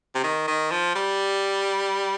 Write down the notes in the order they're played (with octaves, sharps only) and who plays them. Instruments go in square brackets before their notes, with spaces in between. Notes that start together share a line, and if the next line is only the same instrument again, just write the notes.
[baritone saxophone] C3
D#3
D#3
F3
G3